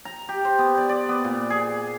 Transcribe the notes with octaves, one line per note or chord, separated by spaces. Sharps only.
A#5
G4
C5
B3
D5
D5
B3
A#2
G#4